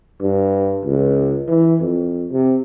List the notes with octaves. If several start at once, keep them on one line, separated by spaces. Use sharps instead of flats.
G2
C#2
E3
F2
C3